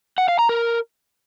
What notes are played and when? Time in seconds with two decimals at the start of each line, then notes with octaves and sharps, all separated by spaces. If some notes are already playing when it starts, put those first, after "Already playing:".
0.18 F#5
0.28 F5
0.39 A#5
0.49 A#4